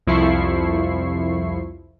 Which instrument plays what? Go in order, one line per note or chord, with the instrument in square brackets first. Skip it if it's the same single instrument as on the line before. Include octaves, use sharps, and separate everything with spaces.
[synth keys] C2 F2 F3 E4 C#6 C7